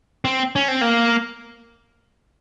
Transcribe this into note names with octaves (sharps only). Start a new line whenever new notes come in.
C4
C#4
C4
A#3